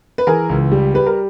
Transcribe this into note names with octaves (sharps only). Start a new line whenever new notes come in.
B4
E3 G#4 A#4
C#2
G3
G3 B4
A#4